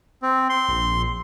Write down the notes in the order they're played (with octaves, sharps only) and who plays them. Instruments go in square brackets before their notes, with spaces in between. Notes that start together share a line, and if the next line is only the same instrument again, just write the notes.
[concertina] C4
C6
[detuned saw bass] A#1